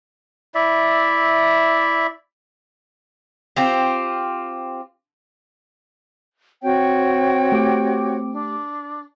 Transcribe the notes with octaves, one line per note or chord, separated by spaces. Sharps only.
E4 D5 E5
C4 F4 G4
C4 F#4 C#5 G5
A3 G4 D6
D4